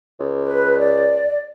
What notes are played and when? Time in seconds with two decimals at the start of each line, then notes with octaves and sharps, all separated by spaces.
0.20 C#2
0.43 B4
0.77 D5